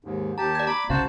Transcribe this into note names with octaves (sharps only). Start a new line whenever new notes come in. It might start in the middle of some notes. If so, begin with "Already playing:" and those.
D#2 G#2
D#2 G4 A5 A#5
D5 G#6
A#5 B5 D6
F#1 C2 C#3 F#4 C5 F5 A5